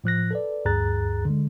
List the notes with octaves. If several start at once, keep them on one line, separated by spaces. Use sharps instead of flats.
A2 F3 F#6 A#6
A4 B4 D5
D2 G2 G#4 A#5 F#6 A6
D3 G#3